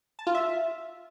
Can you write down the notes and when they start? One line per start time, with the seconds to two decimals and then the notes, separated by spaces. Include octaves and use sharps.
0.19 A5
0.27 F4
0.35 E5